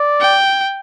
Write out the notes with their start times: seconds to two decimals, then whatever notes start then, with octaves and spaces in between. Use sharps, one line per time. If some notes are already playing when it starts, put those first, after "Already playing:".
Already playing: D5
0.21 G5